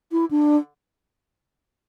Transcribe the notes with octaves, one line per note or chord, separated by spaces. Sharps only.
E4
D4